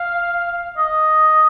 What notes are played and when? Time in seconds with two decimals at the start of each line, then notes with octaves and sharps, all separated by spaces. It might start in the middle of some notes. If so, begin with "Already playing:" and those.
Already playing: F5
0.77 D#5